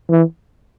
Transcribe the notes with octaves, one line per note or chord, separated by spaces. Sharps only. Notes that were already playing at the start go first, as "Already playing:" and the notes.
E3